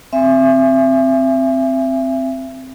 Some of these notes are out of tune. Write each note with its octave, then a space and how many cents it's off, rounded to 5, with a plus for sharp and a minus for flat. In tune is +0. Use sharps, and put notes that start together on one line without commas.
C4 +0 E5 +30 G#5 -15